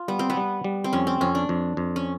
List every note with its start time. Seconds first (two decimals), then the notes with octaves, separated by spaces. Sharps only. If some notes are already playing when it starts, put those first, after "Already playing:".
Already playing: F4
0.08 G3 B3
0.19 C4
0.30 B3
0.37 G3
0.64 G3
0.84 C4
0.93 F2 C#4
1.07 C4
1.21 F2 C#4
1.35 D4
1.49 F2
1.77 F2
1.96 C#4